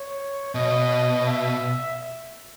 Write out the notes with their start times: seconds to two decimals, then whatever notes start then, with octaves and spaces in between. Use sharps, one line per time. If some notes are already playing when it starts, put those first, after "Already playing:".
Already playing: C#5
0.55 B2 D#5
1.26 E5